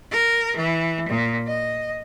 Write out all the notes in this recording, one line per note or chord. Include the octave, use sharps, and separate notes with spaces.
A#4
E3
A#2
D#5